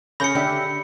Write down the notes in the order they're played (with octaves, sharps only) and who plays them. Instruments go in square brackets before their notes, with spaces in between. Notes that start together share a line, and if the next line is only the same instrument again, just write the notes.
[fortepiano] C#3 C#4 G#4 [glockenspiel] B5 C#7 [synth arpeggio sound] G6 A#6
[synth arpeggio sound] D3 E5 [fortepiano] D4 [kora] G4